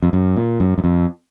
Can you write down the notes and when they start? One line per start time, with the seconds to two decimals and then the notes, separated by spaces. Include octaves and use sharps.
0.03 F2
0.13 F#2
0.37 A#2
0.60 F#2
0.78 F#2
0.84 F2